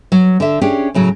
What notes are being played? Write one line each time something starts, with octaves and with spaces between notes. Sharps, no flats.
F#3
D3 E5
C#4 D4 G4 G#4
A2 C#3 F#3